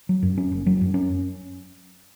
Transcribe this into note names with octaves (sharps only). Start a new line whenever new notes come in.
F#3
F#2
C#4
F#1
F#3
F#2
C#4